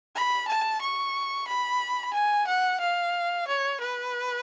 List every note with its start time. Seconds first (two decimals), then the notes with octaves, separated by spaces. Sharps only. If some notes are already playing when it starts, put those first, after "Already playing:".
0.16 B5
0.48 A5
0.81 C#6
1.48 B5
2.14 G#5
2.47 F#5
2.80 F5
3.47 C#5
3.81 B4